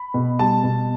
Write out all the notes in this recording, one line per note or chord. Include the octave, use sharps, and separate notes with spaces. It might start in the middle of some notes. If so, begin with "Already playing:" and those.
Already playing: B5
B2
G3 A5
B2